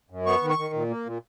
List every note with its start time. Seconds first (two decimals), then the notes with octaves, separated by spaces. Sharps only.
0.10 F#2
0.26 B3 C#6
0.42 D#3
0.50 C#6
0.58 D#3
0.74 A#2
0.90 A#3
1.06 A#2